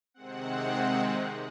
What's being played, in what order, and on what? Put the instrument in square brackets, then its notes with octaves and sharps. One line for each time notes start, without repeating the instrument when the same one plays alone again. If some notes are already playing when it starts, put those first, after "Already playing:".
[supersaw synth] C3 D#3 G#3 C4 F#5